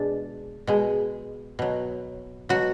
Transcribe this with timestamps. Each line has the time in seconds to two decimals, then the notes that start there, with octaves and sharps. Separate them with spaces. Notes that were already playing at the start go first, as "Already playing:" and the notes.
Already playing: B2 G#3 D4
0.67 B2 G#3
1.59 B2 F#3
2.49 B2 F#3 F#4